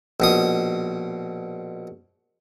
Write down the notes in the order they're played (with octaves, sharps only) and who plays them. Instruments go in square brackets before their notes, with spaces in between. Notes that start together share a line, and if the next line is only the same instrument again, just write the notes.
[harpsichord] A#1 B2 D#6